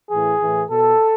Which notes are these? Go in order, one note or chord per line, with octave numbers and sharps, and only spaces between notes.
A2 E3 G#4
A2 E3
B2 A4